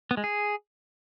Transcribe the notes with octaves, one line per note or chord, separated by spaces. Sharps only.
B3
G#3
G#4